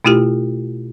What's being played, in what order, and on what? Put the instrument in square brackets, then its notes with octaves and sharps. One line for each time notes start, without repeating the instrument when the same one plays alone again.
[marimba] B2 A3 E4 F4 G4